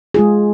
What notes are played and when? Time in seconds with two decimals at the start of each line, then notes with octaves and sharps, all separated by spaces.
0.14 G#3 F4 G#4